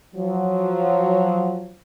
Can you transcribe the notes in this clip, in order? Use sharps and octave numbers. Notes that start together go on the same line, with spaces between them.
F3 F#3